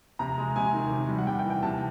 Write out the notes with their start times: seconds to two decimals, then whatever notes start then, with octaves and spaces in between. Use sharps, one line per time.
0.19 C3 A#5
0.38 G#3
0.56 C3 G#5
0.74 D#3
0.91 C3
1.09 G3
1.18 F#5
1.27 C3 G5
1.39 G5
1.44 E3
1.50 G5
1.63 C3 A5